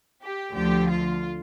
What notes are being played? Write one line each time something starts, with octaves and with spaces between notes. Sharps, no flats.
G4
D2 D3 F3 A3 G4
F4